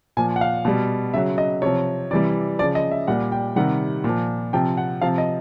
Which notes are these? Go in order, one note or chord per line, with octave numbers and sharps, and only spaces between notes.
A#2 F3 G#5
F#5
F5
B2 G3
C#3 F#3 E5
D#5
C3 F3 C#5
C3 E3 G3 D5
C#3 F3 D5
D#5
E5
A#2 G3 F#5
G5
C3 D#3 G3 F#5
A#2
F3
C3 F3 G5
F#5
C3 F3 F5
D#5